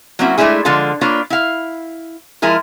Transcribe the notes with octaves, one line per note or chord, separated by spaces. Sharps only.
F#3 A#3 C4 C#4 E4 F#4
G#3 A3 C4 D4 E4 G#4
D3 F3 G#3 F4 A4
A#3 D4 F4 B4 C#5
E4 F5
F3 G#3 E4 G#4 A#4